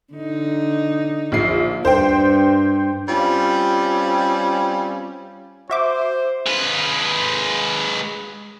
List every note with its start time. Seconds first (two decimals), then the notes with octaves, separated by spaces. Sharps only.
0.14 D3 D#4
1.32 A#1 C7
1.85 G2 C5 G5
3.09 G3 C4 C#4 F4
5.70 F#4 C5 E5 D6
6.46 G#3 B4